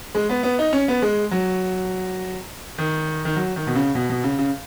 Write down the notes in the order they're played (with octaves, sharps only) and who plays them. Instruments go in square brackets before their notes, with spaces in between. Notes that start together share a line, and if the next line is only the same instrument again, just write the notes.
[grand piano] G#3
B3
B3
D#4
C#4
B3
G#3
F#3
D#3
D#3
F#3
D#3
B2
C#3
B2
B2
C#3
C#3